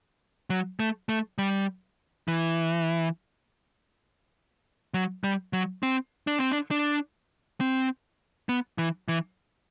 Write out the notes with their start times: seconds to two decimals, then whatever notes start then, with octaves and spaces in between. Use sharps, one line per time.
0.50 F#3
0.80 A3
1.09 A3
1.38 G3
2.28 E3
4.94 F#3
5.24 G3
5.53 F#3
5.83 C4
6.27 D4
6.39 C4
6.52 D4
6.71 D4
7.60 C4
8.49 B3
8.78 E3
9.08 E3